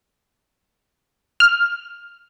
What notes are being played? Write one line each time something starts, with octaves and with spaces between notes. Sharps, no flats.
F6